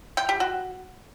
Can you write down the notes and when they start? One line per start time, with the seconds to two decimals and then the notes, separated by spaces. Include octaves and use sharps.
0.17 G5
0.29 G4
0.40 F#4